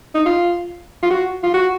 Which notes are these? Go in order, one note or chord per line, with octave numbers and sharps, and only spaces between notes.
D#4
F4
F4
F#4
F4
F#4